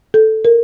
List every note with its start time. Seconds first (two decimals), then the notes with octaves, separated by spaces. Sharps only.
0.14 A4
0.45 A#4